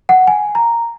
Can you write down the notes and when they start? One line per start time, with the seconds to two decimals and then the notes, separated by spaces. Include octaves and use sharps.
0.09 F#5
0.27 G#5
0.55 A#5